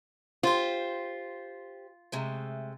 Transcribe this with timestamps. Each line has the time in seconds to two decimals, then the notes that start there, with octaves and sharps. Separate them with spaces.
0.43 F4 G4 C5
2.12 C3 G#3 A3